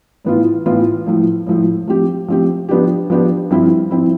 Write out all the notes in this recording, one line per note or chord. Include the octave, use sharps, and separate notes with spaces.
A2 E3 B3 F4
A2 E3 B3 F4
A2 F3 A3
A2 F3 A3
F3 A3 C4 G4
F3 A3 C4 G4
F3 B3 D4 G4
F3 B3 D4 G4
G2 F3 C4 E4
F3 C4 E4